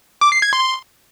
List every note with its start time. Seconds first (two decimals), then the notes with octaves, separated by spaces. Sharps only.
0.21 D6
0.32 C7
0.42 G#6
0.53 C6